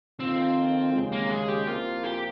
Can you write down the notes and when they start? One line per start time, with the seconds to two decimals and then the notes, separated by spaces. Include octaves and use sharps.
0.19 F2 D#3 A#3 C4 F4
0.94 D#2 C#3 G#3
1.12 A#3
1.30 G#4
1.48 G4
1.67 C2 C3 F3 A#3 F4
2.04 G4